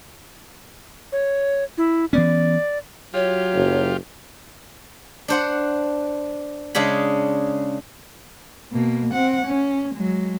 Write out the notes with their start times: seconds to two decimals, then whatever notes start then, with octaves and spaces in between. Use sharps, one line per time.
1.12 C#5
1.78 E4
2.13 E3 B3 C#4 D5
3.14 F#3 F4 G4 C#5
3.54 F#1
5.28 D4 C5 F#5
6.75 C#3 G#3 D4 G#4 B5
8.72 B2 A#3
9.14 C4 F#5
9.46 C#4
9.95 F#3 G#3